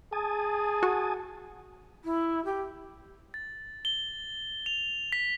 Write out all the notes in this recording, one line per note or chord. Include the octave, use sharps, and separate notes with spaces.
G#4 G#5 A5 D#6
F#4
E4
G4
A6
G7
F7
B6